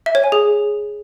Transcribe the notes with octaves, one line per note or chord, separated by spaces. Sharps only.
E5
C#5
G#5
G#4